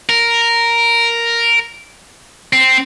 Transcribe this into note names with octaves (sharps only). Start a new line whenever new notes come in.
A#4
C4